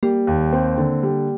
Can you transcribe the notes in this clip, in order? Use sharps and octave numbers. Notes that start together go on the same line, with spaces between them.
G3 A#3
D#2
C4
D3
G3